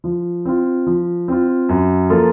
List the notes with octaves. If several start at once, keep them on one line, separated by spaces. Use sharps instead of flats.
F3
C4 F4
F3
C4 F4
F#2
F3 A#3 F4 A4